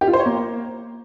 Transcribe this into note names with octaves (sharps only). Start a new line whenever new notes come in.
G4
F4
C5
C#5
A#3